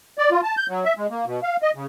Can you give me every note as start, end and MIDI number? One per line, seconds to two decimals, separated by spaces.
0.18 0.31 74
0.31 0.41 65
0.43 0.55 81
0.57 0.66 91
0.69 0.84 54
0.85 0.94 76
0.97 1.07 56
1.10 1.25 58
1.26 1.40 47
1.43 1.56 77
1.62 1.71 75
1.75 1.86 49